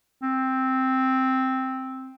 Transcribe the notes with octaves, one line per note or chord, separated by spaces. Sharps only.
C4